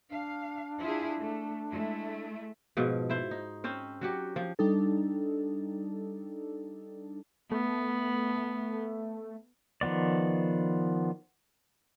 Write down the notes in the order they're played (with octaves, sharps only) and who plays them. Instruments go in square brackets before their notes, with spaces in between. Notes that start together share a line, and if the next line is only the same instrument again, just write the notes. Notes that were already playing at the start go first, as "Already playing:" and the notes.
[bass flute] D4 [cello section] F5
[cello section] E4 F4 G#4
A3
G#3 A3 E4
[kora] G#2 B2 F3
E4 C5
D#4
C4 C#4 C5
F#3 F#4 G4
F3
[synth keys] G3 D4 D#4 A4
[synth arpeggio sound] A3 [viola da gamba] B3
[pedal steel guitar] D#3 F3 B3 D5